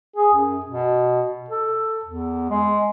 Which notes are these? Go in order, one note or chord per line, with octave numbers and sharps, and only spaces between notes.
G#4
F#2
B2
A4
E2
G#3